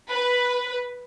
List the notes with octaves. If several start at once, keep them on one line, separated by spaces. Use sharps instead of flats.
B4